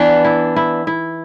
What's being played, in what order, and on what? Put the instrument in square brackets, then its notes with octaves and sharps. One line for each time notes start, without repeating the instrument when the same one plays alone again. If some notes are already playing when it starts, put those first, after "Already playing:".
Already playing: [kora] E3 [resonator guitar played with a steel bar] B3 D4
[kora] E4
E4
E4